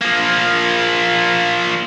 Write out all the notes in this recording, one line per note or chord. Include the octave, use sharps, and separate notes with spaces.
F3 A#3